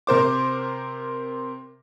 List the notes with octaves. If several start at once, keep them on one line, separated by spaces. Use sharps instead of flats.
C3 A#4 C5 D6